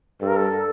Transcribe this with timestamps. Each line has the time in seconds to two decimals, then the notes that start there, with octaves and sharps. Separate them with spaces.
0.21 G2 A4
0.28 A#4
0.36 A4